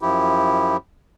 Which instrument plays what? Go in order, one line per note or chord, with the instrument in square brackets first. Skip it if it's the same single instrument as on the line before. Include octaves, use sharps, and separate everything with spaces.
[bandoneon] F#2 F3 E4 G4